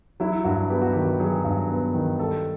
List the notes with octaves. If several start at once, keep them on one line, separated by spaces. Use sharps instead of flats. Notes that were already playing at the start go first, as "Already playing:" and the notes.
F#3 E4
G2 F#4
B3 G4
F#4
D#3 G4
F#3 G#4
G2
B3
D#3
G3 A4